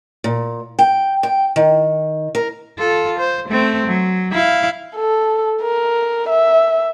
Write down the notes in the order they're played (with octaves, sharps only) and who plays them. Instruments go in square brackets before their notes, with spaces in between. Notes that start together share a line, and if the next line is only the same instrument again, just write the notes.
[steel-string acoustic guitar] A#2
G5
G5
D#3
A#4
[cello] F4 A4
C5
A3 C4
F#3
E4 F5
[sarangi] A4
A#4
E5